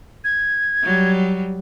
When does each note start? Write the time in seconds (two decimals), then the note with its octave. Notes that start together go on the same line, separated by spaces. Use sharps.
0.24 G#6
0.83 F#3 G3